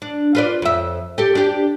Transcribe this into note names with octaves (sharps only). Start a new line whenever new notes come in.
D4
F4 B4 D5
F2 E5
G4 A4
D4 G4